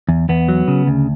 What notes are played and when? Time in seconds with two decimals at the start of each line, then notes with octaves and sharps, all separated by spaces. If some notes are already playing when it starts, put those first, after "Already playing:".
0.09 E2
0.29 E2 B3
0.48 F#3
0.68 C#3
0.87 D2